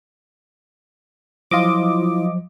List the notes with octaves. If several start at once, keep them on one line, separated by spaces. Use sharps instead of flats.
F3 F#3 E4 F4 D#5 D6